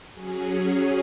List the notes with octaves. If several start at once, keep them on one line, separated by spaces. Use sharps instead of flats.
F#3 C#4 G#4